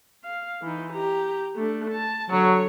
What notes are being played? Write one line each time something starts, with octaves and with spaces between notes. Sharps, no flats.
F5
E3 D#4
G4 A#5
A3 D4
A5
D3 F#3 C#5